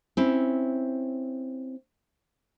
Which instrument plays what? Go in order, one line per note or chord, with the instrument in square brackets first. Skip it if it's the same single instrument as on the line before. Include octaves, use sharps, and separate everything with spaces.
[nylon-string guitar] C4 C#4 E4